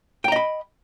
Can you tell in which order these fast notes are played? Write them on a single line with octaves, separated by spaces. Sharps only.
G5 A#5 D#5 B5